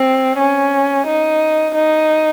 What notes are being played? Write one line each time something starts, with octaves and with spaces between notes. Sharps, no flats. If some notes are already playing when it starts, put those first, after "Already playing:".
Already playing: C4
C#4
D#4
D#4